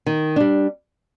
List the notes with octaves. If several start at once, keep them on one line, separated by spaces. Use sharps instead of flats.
D#3
G3 D4